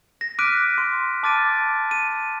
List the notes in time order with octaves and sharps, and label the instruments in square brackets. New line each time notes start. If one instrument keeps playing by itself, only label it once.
[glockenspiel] A#6
D6 F6 F#6 B6 D7 D#7
C6
A5 D6 F6 A6 D7 D#7
D#7